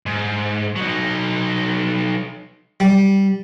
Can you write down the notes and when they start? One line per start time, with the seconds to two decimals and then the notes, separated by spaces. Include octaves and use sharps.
0.06 G#2
0.76 F#3 D#4
2.80 G3